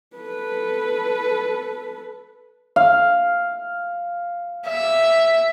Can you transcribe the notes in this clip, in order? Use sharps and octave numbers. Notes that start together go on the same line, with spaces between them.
A4 B4
F5
E5